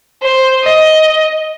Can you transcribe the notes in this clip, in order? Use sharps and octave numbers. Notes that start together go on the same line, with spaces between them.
C5
D#5